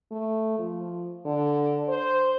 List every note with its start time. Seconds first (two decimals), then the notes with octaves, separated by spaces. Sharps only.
0.12 A3
0.58 F3
1.25 D3
1.89 C5